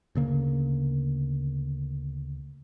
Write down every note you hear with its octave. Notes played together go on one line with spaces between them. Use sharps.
D2 C#3 A#3